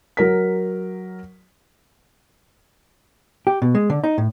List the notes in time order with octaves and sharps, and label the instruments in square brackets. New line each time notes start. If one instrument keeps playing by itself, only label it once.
[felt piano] F#3 A#4 B6
[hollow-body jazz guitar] G4
B2
G#3
D3
D#4
A2